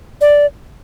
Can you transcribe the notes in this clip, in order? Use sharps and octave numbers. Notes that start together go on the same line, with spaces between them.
D5